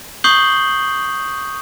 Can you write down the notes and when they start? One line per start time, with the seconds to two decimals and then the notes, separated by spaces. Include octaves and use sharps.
0.24 C#6 D#6 G6 C7 F#7 G7